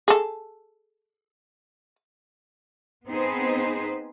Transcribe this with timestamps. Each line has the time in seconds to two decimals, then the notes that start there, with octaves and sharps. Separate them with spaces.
0.08 G#4 A4
3.07 B3 C4 D#4 G#4 B4 C5